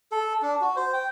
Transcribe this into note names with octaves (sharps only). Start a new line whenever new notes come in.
A4
D4
F#4
C5
G5